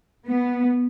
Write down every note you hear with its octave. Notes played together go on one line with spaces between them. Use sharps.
B3